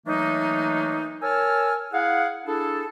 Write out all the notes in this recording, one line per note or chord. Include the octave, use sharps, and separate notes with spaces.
E3 F#3 A3 A#3 D4 D#4
A#4 C#5 G#5 A5 E6 F6
E4 G#4 F5 F#5
D4 E4 G#4 A4